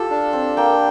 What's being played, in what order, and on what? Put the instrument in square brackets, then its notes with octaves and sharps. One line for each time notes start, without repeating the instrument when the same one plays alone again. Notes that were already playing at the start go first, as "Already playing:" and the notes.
Already playing: [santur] F4 G4 [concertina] A4
[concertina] D4
[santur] C4
[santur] A#3 [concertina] G5